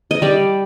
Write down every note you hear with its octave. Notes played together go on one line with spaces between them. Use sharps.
D#5
G3 D5